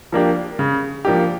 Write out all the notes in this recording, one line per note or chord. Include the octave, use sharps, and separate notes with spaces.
F3 A#3 D4 G4
C#3
F3 A#3 D4 G4